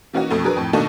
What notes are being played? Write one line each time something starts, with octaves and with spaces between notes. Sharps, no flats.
E3 A#3 C#4 D#4 F#4
F2 B2 A3
F#3 D4 G#4 A#4 B4
F2 A2
B2 D#3 A3 A#3 D4 D#4